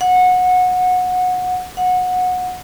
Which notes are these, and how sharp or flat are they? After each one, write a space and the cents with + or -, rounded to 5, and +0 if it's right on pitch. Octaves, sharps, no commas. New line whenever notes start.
F#5 -20
F#5 -20